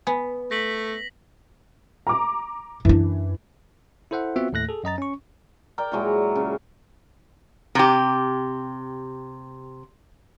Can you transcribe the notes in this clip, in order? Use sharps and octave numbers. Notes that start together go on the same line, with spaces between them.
B3 G#5
A3 A#6 B6 F#7
A#5 D6
F#2 E3 D4
E4 A4 C5 E5 F#5
B3 C4 F4 F#4 E5 F#5
D#2 A2 A3 F#6 A#6
G#4 A4
F#2 D#5 A#5 A6
C#4 C#6
A#4 D5 G5
A#2 E3 F#3 G#3
C#3
C3 G4